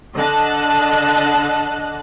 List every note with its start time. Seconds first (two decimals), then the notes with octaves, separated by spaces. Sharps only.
0.15 D3 D#5 A5 F#6